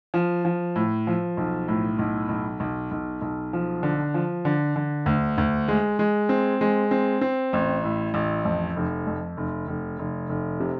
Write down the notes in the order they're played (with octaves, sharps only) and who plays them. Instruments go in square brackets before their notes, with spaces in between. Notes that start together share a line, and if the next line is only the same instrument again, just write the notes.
[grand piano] F3
F3
A2
F3
B1
A2
B1
B1
B1
B1
B1
F3
D3
F3
D3
D3
D2
D2
G#3
G#3
C4
G#3
C4
C4
A1
A2
A1
F2
F1
F2
F1
F1
F1
F1
C3